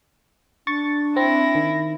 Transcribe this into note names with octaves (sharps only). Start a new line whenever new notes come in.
D4 C#6 A6
C4 E4 A#6
D#3